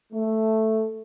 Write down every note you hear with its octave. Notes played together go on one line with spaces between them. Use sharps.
A3